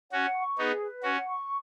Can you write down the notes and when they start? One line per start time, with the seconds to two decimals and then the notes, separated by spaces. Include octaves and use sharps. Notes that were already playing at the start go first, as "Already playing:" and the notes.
0.12 C#4 F#4 F#5
0.35 C#6
0.58 B3 D#4 G#4
0.80 B4
1.03 C#4 F#4 F#5
1.26 C#6